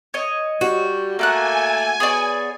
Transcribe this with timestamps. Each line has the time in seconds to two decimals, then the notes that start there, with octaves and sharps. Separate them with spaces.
0.14 C#5 D#5
0.61 G3 F#4
1.19 A3 A#3 F#5 G#5 F#6
2.00 B3 G#4 C#5 D5